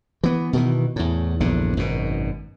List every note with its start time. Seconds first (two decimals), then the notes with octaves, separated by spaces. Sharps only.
0.23 E3 B3
0.53 B2 D#3 E3
0.96 E2 A2
1.40 A#1 E2 G2 D3
1.77 G#1 F#2 B2